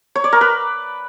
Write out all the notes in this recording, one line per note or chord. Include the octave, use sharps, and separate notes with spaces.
C#5
D5
A#4
B4